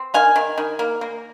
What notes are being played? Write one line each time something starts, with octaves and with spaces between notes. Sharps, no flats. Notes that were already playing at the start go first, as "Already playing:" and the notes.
Already playing: C4
D#3 F5 G#5
D#3
D#3
A#3
A#3